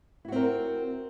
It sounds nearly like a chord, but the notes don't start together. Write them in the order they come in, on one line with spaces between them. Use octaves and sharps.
E4 F#4 C4 A#4